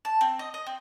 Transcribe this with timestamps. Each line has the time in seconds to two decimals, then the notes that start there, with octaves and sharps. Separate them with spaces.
0.05 A5
0.21 C4
0.39 D#5
0.54 D#5
0.67 C4